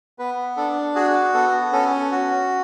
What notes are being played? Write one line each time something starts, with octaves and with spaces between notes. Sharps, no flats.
B3 B4
D4 A4
F#4 G#4
B3 A4
C#4 A4
F#4